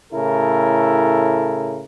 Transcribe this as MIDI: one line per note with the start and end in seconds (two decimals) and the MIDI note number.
0.13 1.84 45
0.13 1.84 49
0.13 1.84 64
0.13 1.84 69
0.13 1.84 70